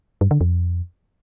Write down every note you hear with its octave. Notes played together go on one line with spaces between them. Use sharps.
G2
D3
F2